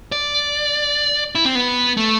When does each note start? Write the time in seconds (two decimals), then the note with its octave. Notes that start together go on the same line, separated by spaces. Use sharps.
0.12 D5
1.35 E4
1.45 C4
1.55 B3
1.97 A3